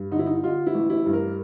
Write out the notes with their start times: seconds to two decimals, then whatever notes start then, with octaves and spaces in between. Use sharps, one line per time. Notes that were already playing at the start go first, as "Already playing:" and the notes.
Already playing: G2
0.11 D3 D#4
0.19 E4
0.26 D#4
0.43 D3 F4
0.67 E4
0.74 A1
0.90 E4
1.06 G2
1.13 A#4